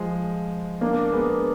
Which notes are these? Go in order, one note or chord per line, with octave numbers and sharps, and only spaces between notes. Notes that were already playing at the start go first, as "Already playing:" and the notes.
Already playing: F3 G#3
A#3 D4
G#3 B3